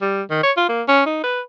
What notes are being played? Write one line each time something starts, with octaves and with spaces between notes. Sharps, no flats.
G3
D#3
C#5
F4
A#3
C#4
D#4
B4